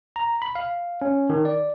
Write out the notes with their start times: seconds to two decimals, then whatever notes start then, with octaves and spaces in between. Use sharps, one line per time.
0.16 A#5
0.42 B5
0.55 F5
1.02 C#4
1.30 D#3
1.45 D5